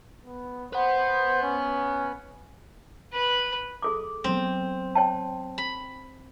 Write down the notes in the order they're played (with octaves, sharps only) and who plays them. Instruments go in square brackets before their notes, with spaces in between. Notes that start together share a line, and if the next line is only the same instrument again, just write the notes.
[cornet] B3
[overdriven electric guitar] B4 F#5 [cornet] C5
[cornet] C#4
[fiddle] B4 B5
[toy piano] G#4 A4 D6
[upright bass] F#3 B3 [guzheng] C4
[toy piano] C#5 G5 A5
[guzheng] B5